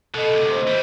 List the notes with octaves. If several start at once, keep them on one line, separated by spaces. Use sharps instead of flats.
B2 A4 D#5
D2 C3
C5 D#5
E3 G3